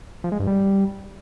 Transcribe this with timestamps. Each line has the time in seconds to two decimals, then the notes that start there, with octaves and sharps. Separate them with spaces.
0.24 F3
0.32 G#3
0.40 G2
0.47 G3